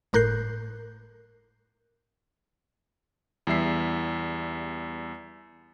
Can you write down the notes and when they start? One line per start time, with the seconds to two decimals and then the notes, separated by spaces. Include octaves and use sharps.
0.13 G1 A2 A#4 F#6 G6 C7
3.47 E2 G3 E5 C7